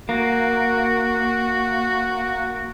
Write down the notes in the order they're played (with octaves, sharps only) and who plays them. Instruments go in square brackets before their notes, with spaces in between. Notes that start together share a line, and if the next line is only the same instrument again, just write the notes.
[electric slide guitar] A#3 [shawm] F#4